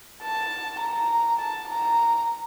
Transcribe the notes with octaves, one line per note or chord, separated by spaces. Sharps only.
A5
A#5
A5
A#5